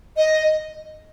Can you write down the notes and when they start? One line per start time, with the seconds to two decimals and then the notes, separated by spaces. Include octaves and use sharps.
0.17 D#5